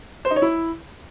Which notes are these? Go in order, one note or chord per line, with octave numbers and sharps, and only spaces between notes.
C5
D#4
C#5
E4